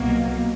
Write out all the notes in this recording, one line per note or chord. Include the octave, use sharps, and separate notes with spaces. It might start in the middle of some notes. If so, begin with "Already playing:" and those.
Already playing: C2 B2 F#3 A#3